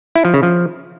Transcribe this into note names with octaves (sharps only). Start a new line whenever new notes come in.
E4
F3
C#3
F3